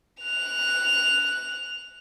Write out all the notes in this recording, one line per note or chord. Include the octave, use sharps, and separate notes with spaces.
F#6 F7